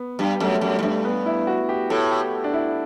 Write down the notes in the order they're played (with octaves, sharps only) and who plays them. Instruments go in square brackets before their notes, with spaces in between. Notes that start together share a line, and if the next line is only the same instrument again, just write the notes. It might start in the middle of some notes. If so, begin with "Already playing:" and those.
Already playing: [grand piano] B3
[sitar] G2 [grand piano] G3
[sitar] F#2 [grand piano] A3
[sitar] F#2 [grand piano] G3
[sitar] A2
[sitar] G2 [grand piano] A3
[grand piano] B3
E4
F#4
G4
[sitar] A2 [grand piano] A4
[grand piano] G4
D4
E4